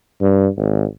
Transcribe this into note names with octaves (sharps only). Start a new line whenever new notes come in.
G2
G#1